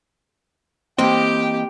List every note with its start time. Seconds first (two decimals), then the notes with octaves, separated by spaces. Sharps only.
0.98 E3 A#3 C4 G4 D#5 G5